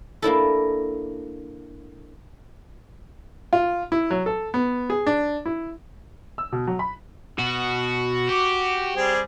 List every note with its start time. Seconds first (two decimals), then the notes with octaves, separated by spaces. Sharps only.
0.22 A#3 D4 E4 A4
3.53 F4
3.92 E4
4.11 F#3
4.26 A4
4.54 B3
4.90 G#4
5.07 D4
5.46 E4
6.38 E6
6.52 B2
6.67 F#3
6.79 B5
7.39 B2 F#4
8.29 G4 D6
8.96 G3 C4 G#4